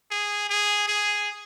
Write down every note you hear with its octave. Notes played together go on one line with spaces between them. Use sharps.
G#4
G#4
G#4